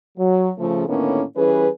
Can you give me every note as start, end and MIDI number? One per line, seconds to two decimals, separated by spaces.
0.18 0.50 54
0.58 0.84 49
0.58 0.84 53
0.58 0.84 57
0.88 1.22 45
0.88 1.22 50
0.88 1.22 51
0.88 1.22 58
0.88 1.22 59
0.88 1.22 61
1.36 1.68 52
1.36 1.68 55
1.36 1.68 61
1.36 1.68 68
1.36 1.68 71